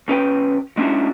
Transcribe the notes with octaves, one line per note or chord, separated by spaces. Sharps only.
B1 C#4 B4 G5
G#3 C#4 D4 E4 F#4